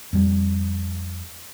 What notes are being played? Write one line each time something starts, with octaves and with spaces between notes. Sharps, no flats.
F2 G3